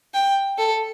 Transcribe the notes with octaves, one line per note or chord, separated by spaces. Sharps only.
G5
A4